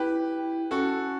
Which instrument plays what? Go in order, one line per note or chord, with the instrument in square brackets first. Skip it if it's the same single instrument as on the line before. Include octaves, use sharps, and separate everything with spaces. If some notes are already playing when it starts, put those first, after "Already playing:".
Already playing: [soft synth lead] E4 [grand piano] G4 B4
[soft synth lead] C#4 [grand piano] F#4 A4